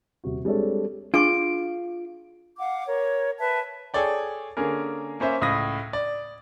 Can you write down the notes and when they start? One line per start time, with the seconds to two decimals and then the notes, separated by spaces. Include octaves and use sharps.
0.24 D#1 C3 F#4
0.45 G3 G#3 C4 D4 A4 C#5
1.14 D4 F4 G#4 C#6 D7
2.58 F5 F#5 D6
2.86 A#4 C#5
3.39 B4 E5 A5
3.94 G#4 A4 C#5 D5 G5
4.57 D3 A#3 C#4 G#4 A#4
5.20 A#3 C#4 C5 E5
5.41 C#2 A2 D#6 G#6 A#6
5.93 D5